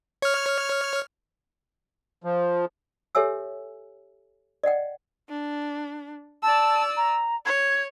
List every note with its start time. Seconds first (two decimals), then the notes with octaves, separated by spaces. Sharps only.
0.22 C#5 F6
2.24 F3
3.15 G4 A4 C#5 E5 G#5 E6
4.64 D5 D#5 F#5 G5
5.29 D4
6.43 D5 A5 E6
6.97 A#5
7.46 C#5 G#6